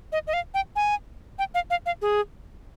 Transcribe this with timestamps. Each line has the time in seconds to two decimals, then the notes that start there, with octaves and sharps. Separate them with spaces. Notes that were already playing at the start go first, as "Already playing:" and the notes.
0.12 D#5
0.27 D#5
0.34 F5
0.54 G5
0.76 G#5
1.39 G5
1.55 F5
1.70 F5
1.86 F5
2.02 G#4